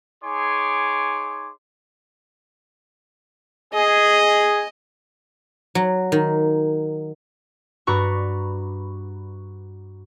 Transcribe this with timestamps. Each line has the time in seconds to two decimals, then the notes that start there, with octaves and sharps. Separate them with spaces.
0.23 D#4 G#4 C#5 G#5 C6 D6
3.74 G#4 D#5
5.75 F#3
6.12 D#3
7.87 G2 F#4 D5 A#5 B5 C#6